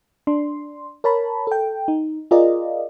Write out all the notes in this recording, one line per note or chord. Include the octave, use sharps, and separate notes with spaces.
D4 C6
A#4 C#5 A5 B5
A4 G5
D#4
F4 G#4 A#4 D5 D#5